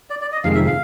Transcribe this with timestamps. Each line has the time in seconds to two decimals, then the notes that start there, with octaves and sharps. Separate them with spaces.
0.10 D5
0.21 D5
0.32 D#5
0.44 F2 C3 D#3 G#3 F5
0.55 E5
0.66 F5